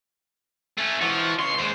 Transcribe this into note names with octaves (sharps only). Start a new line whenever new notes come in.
A3 C#4
E3 F3 F#4
C#2 C#5 C6
D#2 G#3 C5